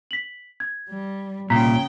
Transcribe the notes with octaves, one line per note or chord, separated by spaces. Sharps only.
B6 F#7
G#6
G3
C2 A#2 C#3 G5 A#5 B6